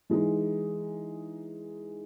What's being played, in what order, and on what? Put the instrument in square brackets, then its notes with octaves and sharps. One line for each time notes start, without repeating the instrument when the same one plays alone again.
[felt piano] E3 G#3 D#4